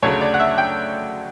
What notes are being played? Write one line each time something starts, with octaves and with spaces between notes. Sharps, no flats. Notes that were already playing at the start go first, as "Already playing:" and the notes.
D2 C#3 F#3 A3 C#5
D5
F#5
E5
G5